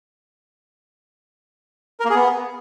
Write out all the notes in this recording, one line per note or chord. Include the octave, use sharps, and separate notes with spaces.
A#4
A#3
G#4
B3